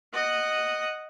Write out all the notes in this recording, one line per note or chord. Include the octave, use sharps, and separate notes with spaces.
D#5 F#5